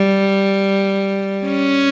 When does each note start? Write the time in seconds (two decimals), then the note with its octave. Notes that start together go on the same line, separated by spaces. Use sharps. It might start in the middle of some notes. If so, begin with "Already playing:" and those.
Already playing: G3
1.47 C#4